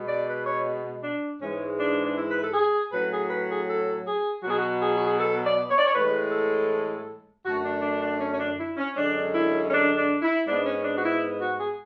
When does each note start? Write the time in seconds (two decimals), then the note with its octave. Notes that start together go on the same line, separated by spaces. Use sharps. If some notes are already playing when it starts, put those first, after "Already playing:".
Already playing: B2 G#3 B3
0.08 D5
0.28 B4
0.46 C#5
1.03 D4
1.40 G#2 E3 G#3 C#4
1.78 D4
2.05 D4
2.16 E4
2.30 B4
2.42 A4
2.54 G#4
2.92 A2 F#3 C#4 B4
3.11 G#4
3.30 B4
3.48 G#4
3.67 A4
4.05 G#4
4.43 B2 F#3 B3 F#4
4.50 G#4
4.59 F#4
4.81 G#4
4.95 F#4
5.07 G#4
5.18 A4
5.44 D5
5.69 C#5
5.78 D5
5.86 C#5
5.94 A2 E3 G#3 B4
6.32 A4
7.45 F#2 D3 A3 F#4
7.64 D4
7.82 D4
8.02 D4
8.20 C#4
8.33 C#4
8.39 D4
8.58 E4
8.77 C#4
8.95 F#2 D3 G#3 C#4 D4
9.34 E4
9.67 C#4
9.71 D4
9.97 D4
10.22 E4
10.47 G#2 G#3 B3 D4
10.66 C#4
10.84 D4
10.96 F#4
11.04 E4
11.41 F#4
11.60 G#4